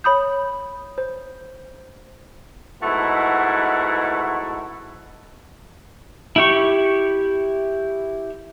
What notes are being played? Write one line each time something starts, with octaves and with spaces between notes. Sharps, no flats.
C#5 B5 D#6 G6
C5
G#2 B2 A3 E4 F#5
E4 G4 C#6